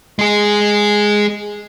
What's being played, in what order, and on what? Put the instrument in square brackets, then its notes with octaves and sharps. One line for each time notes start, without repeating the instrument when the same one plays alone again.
[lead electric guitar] G#3 G#4